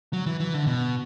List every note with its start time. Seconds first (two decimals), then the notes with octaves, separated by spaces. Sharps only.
0.13 F#3
0.26 E3
0.40 E3
0.53 D3
0.67 B2